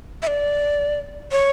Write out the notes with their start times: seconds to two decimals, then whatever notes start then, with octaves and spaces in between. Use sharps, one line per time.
0.22 E5
0.27 D5
1.32 C#5